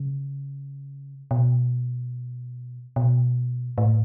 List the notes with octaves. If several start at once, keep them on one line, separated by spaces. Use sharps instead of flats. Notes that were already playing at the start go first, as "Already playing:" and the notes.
Already playing: C#3
B2
B2
A2